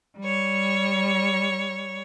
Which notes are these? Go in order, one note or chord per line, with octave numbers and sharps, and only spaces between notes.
G3 C#5